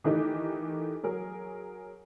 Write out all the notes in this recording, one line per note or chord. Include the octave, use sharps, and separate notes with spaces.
D#3 E3 A3 D#4 G4
F#3 G#4 A#4